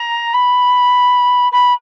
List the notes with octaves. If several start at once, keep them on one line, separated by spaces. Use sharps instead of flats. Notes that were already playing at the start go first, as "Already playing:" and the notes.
Already playing: A#5
B5
B5